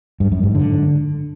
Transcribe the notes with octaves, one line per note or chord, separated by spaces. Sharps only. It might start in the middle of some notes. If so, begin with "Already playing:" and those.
G2
F#2
G#2
D3